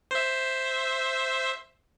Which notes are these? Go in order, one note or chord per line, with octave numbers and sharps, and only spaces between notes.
C5 E5